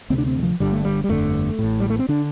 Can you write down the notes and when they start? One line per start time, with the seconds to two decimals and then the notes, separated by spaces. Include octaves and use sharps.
0.10 D2 C3 C4
0.18 D4
0.27 C4
0.38 D3
0.43 F3
0.60 G1 G2 D3 G3
0.72 A3
0.85 G3
1.04 G3
1.09 G1 F2 D3 A3
1.59 A1 A2
1.80 G3
1.90 A3
1.99 C4
2.08 D3 D4